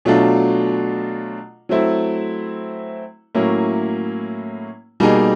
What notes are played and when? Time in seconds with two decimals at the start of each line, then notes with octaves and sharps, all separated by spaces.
0.05 B2 F#3 A3 D4 F4
1.69 F#3 A3 C4 E4
3.35 A2 F#3 A#3 C#4 E4
5.00 B2 G3 A#3 D#4 G#4